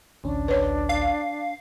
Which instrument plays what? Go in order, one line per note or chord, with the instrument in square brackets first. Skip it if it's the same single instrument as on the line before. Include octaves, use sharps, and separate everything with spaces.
[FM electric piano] A1 D2 C#4 [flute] D4
[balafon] B4 C#5
[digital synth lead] F5